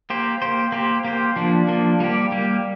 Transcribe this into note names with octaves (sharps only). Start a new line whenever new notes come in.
A#3 G4 C5
A#3 G4 C5
A#3 G4 C5
A#3 G4 C5
F3 A#3 D4
F3 A#3 D4
G3 A#3 G4
G3 A#3 G4